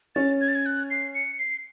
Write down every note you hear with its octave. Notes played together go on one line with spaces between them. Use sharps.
C#4 A6
G#6
A6
G#6
F#6
C7
C#7
C7